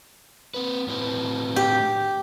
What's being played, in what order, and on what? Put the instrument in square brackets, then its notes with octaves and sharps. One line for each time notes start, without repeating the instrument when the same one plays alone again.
[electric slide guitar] C4 B4
A2 C4 B4
[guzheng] G4